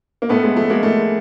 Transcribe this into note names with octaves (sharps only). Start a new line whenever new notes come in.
A#3
A2 A3 B3
G#3
F3 A3
G#3 A#3
A2 A3